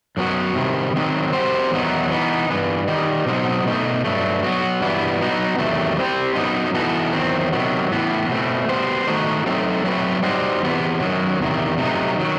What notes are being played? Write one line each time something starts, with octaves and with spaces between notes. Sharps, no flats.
F#2 F#3 B3 F#4
C3 D#3 G3
D#3 F#3 C4 D#4
G3 C4 F#4 C5
E2 D#3 F#3 B3 D#4
E3 B3 D#4
G2 E3 B3
D#3 G3 D#4
B2 F#3 C4 D#4
B2 A3 D#4
G2 F#3 A3
F#3 B3 F#4
G2 E3 G3 B3 E4
F#3 B3 D#4 F#4
E2 C3 D#3 F#3 A3
G3 C4 D#4 G4 C5
F#2 F#3 B3 D#4
E3 B3 D#4 F#4 A4
E2 D#3 F#3 C4
C3 D#3 F#3 B3
A2 E3 B3
B2 A3 C4
G3 B3 F#4 C5
D#3 A3 D#4 F#4
F#3 A3 C4 D#4 A4
F#3 A3 C4 F#4 B4
G3 D#4 F#4 C5
E2 C3 E3 B3
F#2 D#3 F#3
E2 C3 D#3
C3 F#3 A3 D#4
D#3 F#3